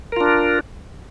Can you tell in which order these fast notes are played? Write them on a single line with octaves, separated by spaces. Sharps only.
A#4 F4 D4